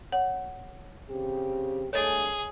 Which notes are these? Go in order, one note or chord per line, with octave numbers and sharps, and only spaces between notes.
C#5 F#5
C#3 C4 G4
G2 A3 G#4 A4 C#5 D#5 G#5